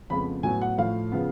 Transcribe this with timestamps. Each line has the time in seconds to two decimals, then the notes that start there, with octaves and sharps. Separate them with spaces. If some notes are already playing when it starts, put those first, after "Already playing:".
0.10 F2 C#3 F3 G#3 B3 B5
0.43 A2 F#3 B3 G#5
0.62 F#5
0.78 A2 F3 A3 F5
1.12 C#3 F3 B3